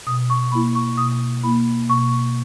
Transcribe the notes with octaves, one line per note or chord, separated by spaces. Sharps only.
B2 D#6
C#6
A#3 E4 B5
C#6
B2 D#6
A#3 E4 B5
B2 C#6